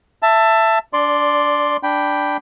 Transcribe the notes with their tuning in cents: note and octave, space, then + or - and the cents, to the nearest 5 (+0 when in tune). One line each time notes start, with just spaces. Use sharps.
E5 +15 A5 +15
D4 -25 D5 +0 C6 +0
D4 +0 G5 +0 B5 +0